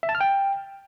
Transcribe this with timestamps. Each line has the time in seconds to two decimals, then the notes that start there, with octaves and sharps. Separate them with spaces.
0.03 E5
0.09 A5
0.15 F6
0.21 G5